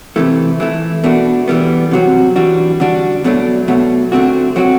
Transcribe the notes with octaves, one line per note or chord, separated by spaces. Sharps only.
C3 E3 A3 E4
E3 A3 E4
B2 A3 D4 F#4
E3 G3 B3
C3 F#3 C4 F#4
E3 G3 D4 F#4
D3 G3 D4 F#4
B2 F#3 A3 D4
B2 F#3 A3
D3 A3 C4 F#4
F#3 C4 F#4